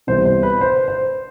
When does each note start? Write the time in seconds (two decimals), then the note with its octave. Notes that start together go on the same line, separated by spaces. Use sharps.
0.07 C2 C3 E3 G3 B3 C5
0.25 C5
0.43 B4
0.61 C5
0.88 C5